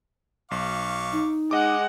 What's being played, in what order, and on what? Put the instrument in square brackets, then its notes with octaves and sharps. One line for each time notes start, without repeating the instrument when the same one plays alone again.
[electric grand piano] B1 [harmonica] F5 C#6 D6
[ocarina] D#4
[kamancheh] G#3 F#5 [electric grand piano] D#5 D6